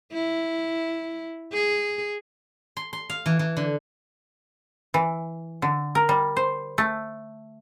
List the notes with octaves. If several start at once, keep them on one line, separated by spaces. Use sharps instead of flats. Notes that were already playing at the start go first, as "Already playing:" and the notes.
E4
G#4
C6
C6
F5
E3
E3
D3
E3
D3
A#4
G3
C5
A3